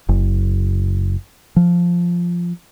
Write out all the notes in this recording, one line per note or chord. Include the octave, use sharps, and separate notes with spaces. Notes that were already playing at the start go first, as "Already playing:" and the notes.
F#1
F3